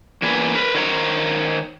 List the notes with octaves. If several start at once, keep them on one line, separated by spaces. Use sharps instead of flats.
E2 A#3 G#4 B4
A#4 B4
D#3 A#4 C5 C#5 G#5 A#5